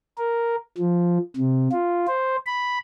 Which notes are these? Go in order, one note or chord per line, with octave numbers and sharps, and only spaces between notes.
A#4
F3
C3
F4
C5
B5